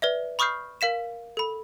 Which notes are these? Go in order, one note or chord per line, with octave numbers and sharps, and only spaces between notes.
B4 D5 E5
B5 C#6 D#6 F6 G6 C7
A#4 F5 B6 E7
A4 B5